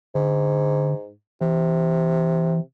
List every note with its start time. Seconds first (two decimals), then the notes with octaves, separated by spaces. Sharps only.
0.15 G#2 D3
1.41 C3 E3